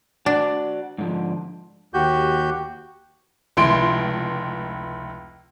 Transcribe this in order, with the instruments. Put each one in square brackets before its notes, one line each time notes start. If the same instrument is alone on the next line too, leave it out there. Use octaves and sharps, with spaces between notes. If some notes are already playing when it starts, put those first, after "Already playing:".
[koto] D4 [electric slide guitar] F#4 D5 F#5
[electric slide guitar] G#2 D3 F3
[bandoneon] D#2 F#4 G4 G6
[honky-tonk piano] F1 C#2 E4 C6 D7